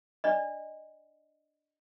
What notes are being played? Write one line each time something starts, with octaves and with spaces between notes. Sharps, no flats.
D4 D5 D#5